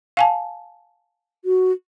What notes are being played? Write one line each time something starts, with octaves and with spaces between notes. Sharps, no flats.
F5 G#5 A5
F#4